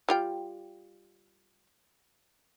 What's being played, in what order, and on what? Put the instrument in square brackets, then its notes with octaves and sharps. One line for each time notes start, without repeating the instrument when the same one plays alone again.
[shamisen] G3 F4 G5